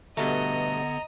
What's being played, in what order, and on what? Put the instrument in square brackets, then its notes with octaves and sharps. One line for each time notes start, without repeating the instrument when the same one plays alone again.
[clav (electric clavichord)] G2 B2 A3 [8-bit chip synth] D3 B3 [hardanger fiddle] D#5 [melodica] A#5